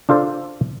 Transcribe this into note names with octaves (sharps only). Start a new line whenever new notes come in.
D4 F4 A4 C5 D5